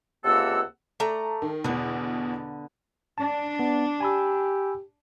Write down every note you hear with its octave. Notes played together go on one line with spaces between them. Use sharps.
C#2 C3 A#3 A4 F#5 E6
A3 D5 A#5
D#3
E2 B2 D3 B3
D4 A5
B3
G4 G#5 B5 E6